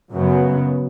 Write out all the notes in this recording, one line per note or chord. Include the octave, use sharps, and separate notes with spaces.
F#2 C#3 F#3 B3